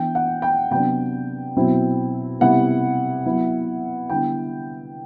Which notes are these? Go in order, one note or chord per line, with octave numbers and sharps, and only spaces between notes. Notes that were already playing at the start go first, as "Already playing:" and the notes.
Already playing: E3 B3 D4 G5
F#5
G5
C3 F#3 B3 D4 G5
B2 F#3 C4 E4
C3 G3 B3 E4 F#5
F#3 B3 E4
D3 G3 B3 E4 G5